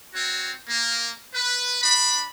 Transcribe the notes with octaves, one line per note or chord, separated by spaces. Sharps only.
C4 F#4 C#5
A#3
B4
D4 B5